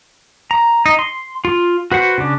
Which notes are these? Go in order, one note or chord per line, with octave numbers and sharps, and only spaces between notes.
A#5
D#4
C6
F4
F#4 B4 C5 F#5
C#3 D4